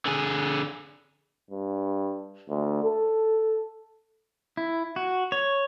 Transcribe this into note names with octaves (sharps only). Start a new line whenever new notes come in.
D3 G#4
G2
D2
A4
E4
F#4
C#5